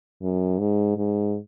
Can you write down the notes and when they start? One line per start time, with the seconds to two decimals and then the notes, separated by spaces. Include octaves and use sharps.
0.22 F#2
0.60 G#2
0.97 G#2